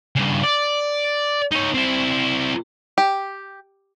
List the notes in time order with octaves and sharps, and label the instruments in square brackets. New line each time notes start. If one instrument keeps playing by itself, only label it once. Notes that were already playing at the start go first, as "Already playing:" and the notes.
[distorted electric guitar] G2 C#3
D5
D#4 C#5
C4 E4
[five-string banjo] G4